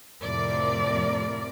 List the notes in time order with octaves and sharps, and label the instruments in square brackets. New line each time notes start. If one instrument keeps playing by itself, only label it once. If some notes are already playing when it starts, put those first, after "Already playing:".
[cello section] F2 A2 C3 F3 A#4 D5